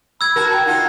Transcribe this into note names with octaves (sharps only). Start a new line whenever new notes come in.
B5 E6 G#6
F#4 A#4 A5
G5
D#4 F4 F#5